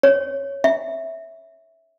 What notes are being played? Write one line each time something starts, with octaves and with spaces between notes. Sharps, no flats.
C#5
E5